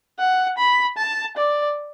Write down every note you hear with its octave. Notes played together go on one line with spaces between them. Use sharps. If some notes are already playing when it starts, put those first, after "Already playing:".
F#5
B5
A5
D5